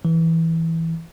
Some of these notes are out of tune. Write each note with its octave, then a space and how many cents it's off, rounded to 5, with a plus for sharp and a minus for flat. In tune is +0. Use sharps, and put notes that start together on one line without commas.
E3 -10